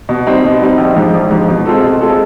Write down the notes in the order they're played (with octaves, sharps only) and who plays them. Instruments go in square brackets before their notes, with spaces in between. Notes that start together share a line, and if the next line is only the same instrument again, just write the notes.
[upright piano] B2
G3 C4 D#4
B2
G3 C4 D#4
A#1
G#2 F3
A#1
G#2 F3
B2
G#3 C4 F4 A4
B2
G#3 C4 F4 A4